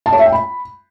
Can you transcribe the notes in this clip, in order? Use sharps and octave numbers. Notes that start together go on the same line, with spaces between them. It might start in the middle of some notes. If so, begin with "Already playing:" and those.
A5
C#5
E5
G5
B5